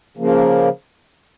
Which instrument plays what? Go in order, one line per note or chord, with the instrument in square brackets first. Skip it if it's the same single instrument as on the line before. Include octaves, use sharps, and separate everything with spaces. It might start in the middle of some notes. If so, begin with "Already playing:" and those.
[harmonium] C#3 F3 A#3